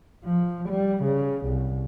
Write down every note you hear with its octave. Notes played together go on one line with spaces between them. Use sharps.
F3
G3
C#3
C2